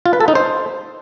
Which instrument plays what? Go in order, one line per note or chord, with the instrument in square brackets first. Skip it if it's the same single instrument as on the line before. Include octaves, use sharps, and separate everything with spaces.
[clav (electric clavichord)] F4
B4
A4
D#4
C5